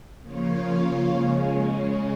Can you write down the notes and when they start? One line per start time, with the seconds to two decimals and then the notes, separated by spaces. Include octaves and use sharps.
0.22 C#3 F3 A#3 F4 C#5
1.06 C#3 G#3 C#4